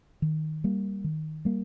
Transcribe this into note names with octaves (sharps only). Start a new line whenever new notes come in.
D#3
G3 A#3
D#3
G3 A#3